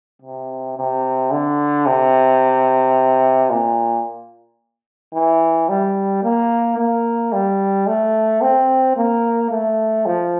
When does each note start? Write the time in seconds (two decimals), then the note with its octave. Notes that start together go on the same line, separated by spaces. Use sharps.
0.22 C3
0.77 C3
1.31 D3
1.86 C3
3.50 A#2
5.14 E3
5.69 G3
6.23 A#3
6.78 A#3
7.33 G3
7.87 A3
8.42 C4
8.97 A#3
9.51 A3
10.06 F3